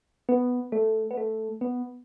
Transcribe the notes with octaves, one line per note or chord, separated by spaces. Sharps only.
B3
A3
B3
A3
B3